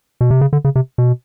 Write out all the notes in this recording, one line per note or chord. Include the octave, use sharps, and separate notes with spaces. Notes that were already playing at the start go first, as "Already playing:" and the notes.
B2
C3
C#3
D3
C#3
C3
B2